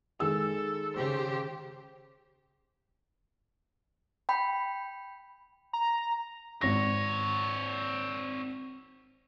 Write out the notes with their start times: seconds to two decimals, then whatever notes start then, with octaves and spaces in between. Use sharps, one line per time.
0.20 D#3 G#3 A4 E6
0.97 C#3 G4 C5
4.29 G5 B5
5.73 A#5
6.61 G#1 C4 C#5 A#6